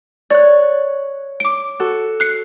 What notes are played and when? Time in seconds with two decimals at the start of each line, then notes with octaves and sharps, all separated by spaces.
0.30 C#5 D5 F#6
1.40 D6 D7
1.80 F#4 A4
2.20 F#6 C7 C#7